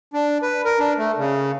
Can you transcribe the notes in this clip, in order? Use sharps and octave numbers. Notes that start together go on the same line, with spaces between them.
D4
B4
A#4
D4
A3
C#3